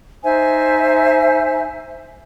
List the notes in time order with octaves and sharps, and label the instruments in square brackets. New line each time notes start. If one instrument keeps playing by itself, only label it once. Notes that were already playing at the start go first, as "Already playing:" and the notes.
[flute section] D#4 C5 E5 G#5